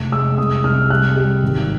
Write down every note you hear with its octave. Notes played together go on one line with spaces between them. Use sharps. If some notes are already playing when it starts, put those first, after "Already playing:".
Already playing: F1
G#3 E6
C2 D#6
C2 F6
G3 F#6
G3
G#1